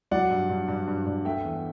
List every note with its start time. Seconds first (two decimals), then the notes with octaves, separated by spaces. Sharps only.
0.11 F#3 D5 F#5
0.30 G2
0.49 G2
0.68 G2
0.87 G2
1.06 G2
1.25 A3 E5 G5
1.44 E2